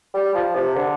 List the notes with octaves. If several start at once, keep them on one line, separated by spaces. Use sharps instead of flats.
G3
F3
C3
D3